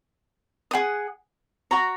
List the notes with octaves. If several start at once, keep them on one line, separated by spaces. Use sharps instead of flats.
G#4 F#5 D#6
F#4 C#5 A#5